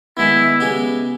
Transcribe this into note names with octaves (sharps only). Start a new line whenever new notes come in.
D#3 G#3 B3 E4
C#3 G#3 B3 G4